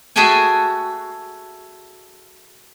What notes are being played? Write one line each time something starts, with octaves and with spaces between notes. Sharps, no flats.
F#4 G#4 A4 E5 G5 G#5